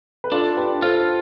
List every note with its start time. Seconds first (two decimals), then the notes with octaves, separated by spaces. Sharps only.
0.24 B4
0.32 D4 F4 A4
0.57 G4 B4
0.82 F4 A4 C5